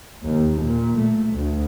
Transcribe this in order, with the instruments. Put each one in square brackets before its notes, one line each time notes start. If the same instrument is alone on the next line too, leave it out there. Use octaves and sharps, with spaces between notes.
[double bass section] D#2
A#2
A3
D2